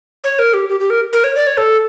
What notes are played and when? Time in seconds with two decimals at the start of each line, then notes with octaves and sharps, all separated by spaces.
0.24 C#5
0.39 A#4
0.54 G4
0.69 G4
0.80 G4
0.90 A#4
1.13 A#4
1.24 C#5
1.35 D5
1.47 C#5
1.57 A4